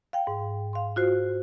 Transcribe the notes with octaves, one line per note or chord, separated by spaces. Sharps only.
F5 G5
G#2
F5 C6
F4 F#4 C5